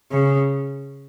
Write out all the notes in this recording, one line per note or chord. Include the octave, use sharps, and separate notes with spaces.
C#3